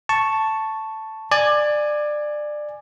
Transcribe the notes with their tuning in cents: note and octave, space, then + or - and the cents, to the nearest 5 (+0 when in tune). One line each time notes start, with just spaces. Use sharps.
A5 +0 C#6 +0
D5 +20 G#5 +0